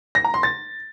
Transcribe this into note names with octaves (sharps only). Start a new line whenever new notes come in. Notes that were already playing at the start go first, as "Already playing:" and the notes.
A#6
A#5
C6
A6